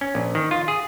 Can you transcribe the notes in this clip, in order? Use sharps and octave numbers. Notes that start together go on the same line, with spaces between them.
C#4
A#1
D#3
F4
G#4